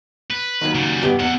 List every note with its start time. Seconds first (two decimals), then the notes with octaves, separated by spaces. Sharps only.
0.30 B4
0.61 D#3 F#3 A#3
0.75 C#3 G3
1.03 G2 B3 G4
1.20 E2 C3 F#5